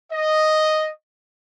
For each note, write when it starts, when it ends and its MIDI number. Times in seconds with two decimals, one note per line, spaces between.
0.12 0.90 75